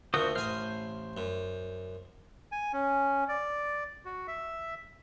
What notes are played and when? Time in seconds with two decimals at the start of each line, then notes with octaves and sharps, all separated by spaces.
0.14 D2 A#2 F#4 C5 D#6
0.35 A1 C5 G#5 D#6 F6
1.17 F#2
2.52 G#5
2.73 C#4
3.29 D5
4.05 F#4
4.28 E5